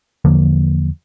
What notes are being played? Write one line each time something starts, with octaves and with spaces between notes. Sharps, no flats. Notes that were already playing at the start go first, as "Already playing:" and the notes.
E2 D3 F3 A#3